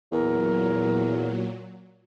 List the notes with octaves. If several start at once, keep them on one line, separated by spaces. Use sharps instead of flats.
E2 A#2 F#3 A#4